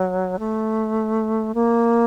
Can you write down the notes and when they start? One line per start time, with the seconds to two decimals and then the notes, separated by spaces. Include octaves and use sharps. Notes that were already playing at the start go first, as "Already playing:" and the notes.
Already playing: F#3
0.39 A3
1.55 A#3